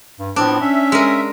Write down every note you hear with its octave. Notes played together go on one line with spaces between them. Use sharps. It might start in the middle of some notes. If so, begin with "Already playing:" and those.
G2
A2 F3 B3 C4 D4
C#4 E5
G#3 A#4